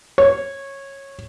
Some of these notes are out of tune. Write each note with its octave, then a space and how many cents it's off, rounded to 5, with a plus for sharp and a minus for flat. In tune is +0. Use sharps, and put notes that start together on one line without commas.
C#5 -15